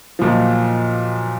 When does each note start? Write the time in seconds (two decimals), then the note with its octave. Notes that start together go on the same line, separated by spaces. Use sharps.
0.19 B1 A#2 F3